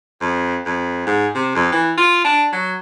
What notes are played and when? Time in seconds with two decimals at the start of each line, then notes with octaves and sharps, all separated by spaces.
0.21 F2
0.66 F2
1.06 G#2
1.35 C3
1.55 F2
1.72 E3
1.97 F4
2.25 D4
2.52 F#3